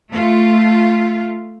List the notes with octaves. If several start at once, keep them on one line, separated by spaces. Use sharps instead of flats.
A3 F4